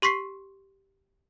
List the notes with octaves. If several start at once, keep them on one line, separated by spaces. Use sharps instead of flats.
G4 C6 C#6 B6 C7